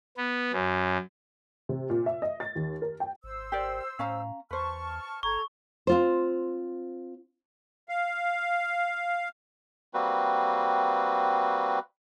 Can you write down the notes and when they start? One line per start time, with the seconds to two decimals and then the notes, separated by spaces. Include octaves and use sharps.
0.17 B3
0.53 F#2
1.69 C3
1.90 A#2
2.06 E5
2.22 D#5
2.40 A6
2.56 D#2
2.82 A#4
3.00 G5
3.24 G#1 C5 E6
3.52 G4 A#4 D5
3.99 A2 C#4 F5 A#5
4.51 E2 B4 C5 A5 C#6 F6
5.23 G1 A4 A#5 C#6 G#6
5.87 C4 F4 C5
7.89 F5
9.94 G3 A#3 C4 F#4 B4